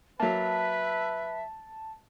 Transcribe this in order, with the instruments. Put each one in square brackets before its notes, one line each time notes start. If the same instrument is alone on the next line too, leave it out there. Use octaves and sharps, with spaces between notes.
[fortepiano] F#3 A#3 [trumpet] B4 [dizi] E5 [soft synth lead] A5